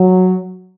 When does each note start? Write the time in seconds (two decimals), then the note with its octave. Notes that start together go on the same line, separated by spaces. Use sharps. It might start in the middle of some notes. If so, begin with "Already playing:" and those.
Already playing: F#3